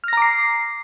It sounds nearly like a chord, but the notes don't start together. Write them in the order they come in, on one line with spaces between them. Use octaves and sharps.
F6 A#6 A#5 D6 C7